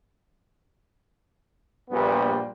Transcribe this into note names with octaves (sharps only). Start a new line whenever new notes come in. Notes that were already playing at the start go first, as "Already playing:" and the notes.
A#1 G2 A#2 G3 B3